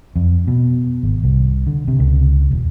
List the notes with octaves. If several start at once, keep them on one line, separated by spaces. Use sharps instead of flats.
F2
B2
G#1
C2
D3
C3
C#2
E1